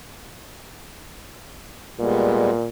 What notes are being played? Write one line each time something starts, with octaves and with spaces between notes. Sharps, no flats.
A#2 G3 G#3 B3